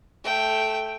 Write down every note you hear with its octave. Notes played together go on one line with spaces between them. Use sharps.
A3 G5